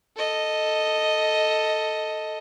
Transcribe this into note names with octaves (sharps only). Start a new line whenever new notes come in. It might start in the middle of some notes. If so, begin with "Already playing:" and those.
A4 D#5